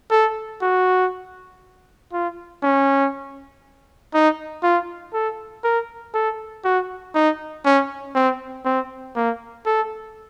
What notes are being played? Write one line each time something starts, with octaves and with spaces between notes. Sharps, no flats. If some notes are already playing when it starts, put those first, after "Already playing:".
A4
F#4
F4
C#4
D#4
F4
A4
A#4
A4
F#4
D#4
C#4
C4
C4
A#3
A4